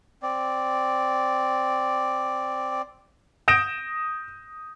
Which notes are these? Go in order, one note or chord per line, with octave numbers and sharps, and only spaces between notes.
C4 D5
D#6 G6 A#6 D7 E7